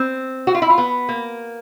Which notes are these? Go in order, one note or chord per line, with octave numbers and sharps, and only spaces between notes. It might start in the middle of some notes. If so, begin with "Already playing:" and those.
Already playing: C4
F#4
F4
E4
F4
B3
A#3